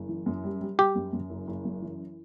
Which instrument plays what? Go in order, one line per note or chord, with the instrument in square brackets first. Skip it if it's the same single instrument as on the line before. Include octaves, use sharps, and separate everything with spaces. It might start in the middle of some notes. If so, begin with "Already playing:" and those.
Already playing: [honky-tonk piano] F#1
E3
F#2
G3
G3
[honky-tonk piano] G3 [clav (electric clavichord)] G4
[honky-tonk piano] F#2
F#2
F#1
F#1
F#2
E3